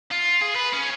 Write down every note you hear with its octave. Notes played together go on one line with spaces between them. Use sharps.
F4
G#4
B4
C#4